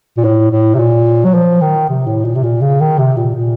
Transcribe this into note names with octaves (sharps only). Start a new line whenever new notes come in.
A#2
A2
A2
C3
A#2
F#3
F3
D#3
C3
A2
A#2
C3
A#2
C#3
D#3
C3
A#2
A#2